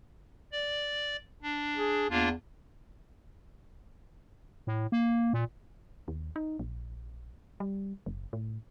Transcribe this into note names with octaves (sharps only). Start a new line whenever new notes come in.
D5
D4
G#4
E2 A#3 D4 F4
A2
A#3
A#2
D#2
D#4
A#1
G3
F#1
A2